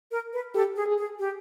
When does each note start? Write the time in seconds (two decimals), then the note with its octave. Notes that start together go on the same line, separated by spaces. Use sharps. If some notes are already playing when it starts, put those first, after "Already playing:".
0.11 A#4
0.33 B4
0.54 G4 A4
0.76 G#4
0.86 G#4
0.98 G#4
1.19 G4